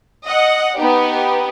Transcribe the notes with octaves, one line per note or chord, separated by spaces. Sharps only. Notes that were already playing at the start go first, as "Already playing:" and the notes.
D#5 F#5
B3 D#4 G4